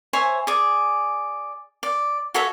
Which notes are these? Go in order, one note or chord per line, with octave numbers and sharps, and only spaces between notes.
C5 C#5 E5 G#5
G#4 D5
D5
F#4 A4 C#5 E5